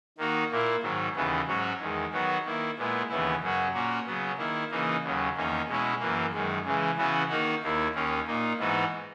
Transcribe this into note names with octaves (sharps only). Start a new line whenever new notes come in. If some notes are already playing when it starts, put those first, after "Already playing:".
D#3 A#3 D#4 F#4
A#2 A#3 E4
G#2 D#3 F#3
D#2 C#3 E3 B3
G#2 F#3 C#4 F#4
E2 D#3 G#3
D#3 F#3 B3 F#4
D#3 A#3 E4
A#2 G#3 B3 E4
D#2 C#3 E3 B3 E4
F#2 C#3 F#3 C#4 F#4
A#2 A#3 C#4 F#4
C#3 F#3 B3
D#3 A#3 E4
C#3 E3 A#3 D#4
D#2 C#3 F#3
E2 D#3 A#3 C#4
B2 G#3 C#4 E4
F#2 E3 A#3
F#2 D#3 G#3
C#3 E3 G#3
C#3 E3 B3 F#4
D#3 A#3 D#4 F#4
D#2 D#3 A#3 E4
D#2 D#3 A#3 C#4
A#2 A#3 D#4
G#2 E3 B3 D#4 F#4